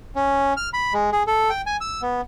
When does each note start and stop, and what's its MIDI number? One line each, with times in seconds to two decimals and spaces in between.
0.15 0.53 61
0.57 0.69 89
0.74 0.93 83
0.93 1.10 56
1.12 1.23 68
1.27 1.50 69
1.50 1.62 79
1.66 1.77 80
1.81 2.02 88
2.02 2.21 59